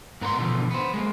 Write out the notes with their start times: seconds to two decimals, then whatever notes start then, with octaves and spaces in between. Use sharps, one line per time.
0.21 G#2 B3 A#4 B4 F#5 C6
0.38 B2 D3 E3 F3
0.71 B3 C5
0.94 G#3 A#3